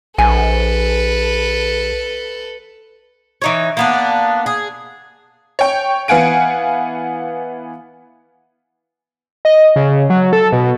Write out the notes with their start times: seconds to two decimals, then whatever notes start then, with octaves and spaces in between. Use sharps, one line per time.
0.18 A#1 A4 B4 G#5
3.42 E3 D#4 C#5
3.77 A#3 B3 D4
4.46 G#4
5.59 C#5 G5
6.08 E3 B3 F5 F#5 G#5 D7
9.45 D#5
9.76 C#3
10.10 F#3
10.33 A4
10.52 B2